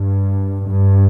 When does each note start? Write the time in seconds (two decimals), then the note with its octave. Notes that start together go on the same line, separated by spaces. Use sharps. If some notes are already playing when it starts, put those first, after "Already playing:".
Already playing: G2
0.65 G2